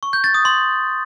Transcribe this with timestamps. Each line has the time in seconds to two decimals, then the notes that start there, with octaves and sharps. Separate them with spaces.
0.03 C#6
0.13 G6
0.24 A6
0.34 D#6
0.45 C6